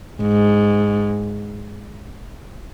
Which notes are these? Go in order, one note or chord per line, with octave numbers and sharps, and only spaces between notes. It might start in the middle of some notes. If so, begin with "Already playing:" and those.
G#2